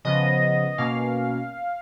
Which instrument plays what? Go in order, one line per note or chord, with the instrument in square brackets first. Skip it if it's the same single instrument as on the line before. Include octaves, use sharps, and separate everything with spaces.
[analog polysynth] C#3 F3 B3 D#5
B2 A#3 C#4 F5